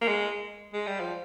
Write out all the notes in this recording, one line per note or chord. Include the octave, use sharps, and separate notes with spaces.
A#3
G#3
G#3
G3
F3